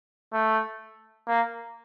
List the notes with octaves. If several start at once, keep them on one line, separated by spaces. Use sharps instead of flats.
A3
A#3